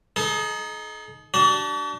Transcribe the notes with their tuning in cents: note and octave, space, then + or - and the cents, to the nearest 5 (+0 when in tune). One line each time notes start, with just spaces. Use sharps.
D#4 +0 A4 -45
D4 +0 F#4 +45